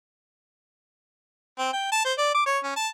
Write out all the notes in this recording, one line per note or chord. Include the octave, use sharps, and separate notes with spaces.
C4
G5
A5
C5
D5
D6
C#5
C#4
A5